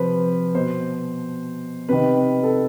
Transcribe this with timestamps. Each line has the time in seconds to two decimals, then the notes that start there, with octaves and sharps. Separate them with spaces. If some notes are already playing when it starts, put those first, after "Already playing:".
Already playing: C3 F3 B4 C5
0.55 B2 C5
1.89 C3 D#3 B4
2.43 A4